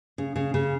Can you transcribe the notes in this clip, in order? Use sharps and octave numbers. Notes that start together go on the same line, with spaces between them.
C#3
C#3
C#3